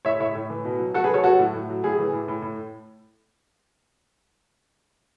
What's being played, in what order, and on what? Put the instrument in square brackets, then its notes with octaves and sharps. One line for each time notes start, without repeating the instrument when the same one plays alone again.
[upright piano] A2 C#5 E5
A2 C#5 E5
A2
E3
B2
F#3
F#3 F#4 A4
G#4 B4
F#3 A4 C#5
F#3 F#4 A4
A2
A2
F#3
A2 G#4
E3
A2
A2
A2